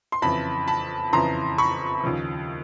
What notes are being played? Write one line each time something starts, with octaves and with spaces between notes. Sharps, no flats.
C6
F2 C#3 E3 A5 B5
A5 B5
F2 C#3 E3 A#5 C6
B5 C#6
D#2 C#3 F3